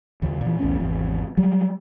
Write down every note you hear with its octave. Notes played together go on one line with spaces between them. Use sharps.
D#2 C#3
A#2 E3
B1 E2 A2 C#4
G#1 E2 C3
F#3 G3